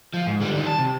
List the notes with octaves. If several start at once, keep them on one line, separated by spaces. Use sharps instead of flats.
F3
G#2
D3 G3
D#3 G3
A5
C3